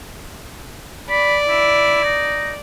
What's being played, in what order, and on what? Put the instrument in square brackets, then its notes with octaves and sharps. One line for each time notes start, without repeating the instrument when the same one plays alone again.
[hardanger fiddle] D5 [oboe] B5
[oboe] E4
D#4